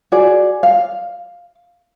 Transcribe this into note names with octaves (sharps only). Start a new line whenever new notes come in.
F#4 G#4 D5
F5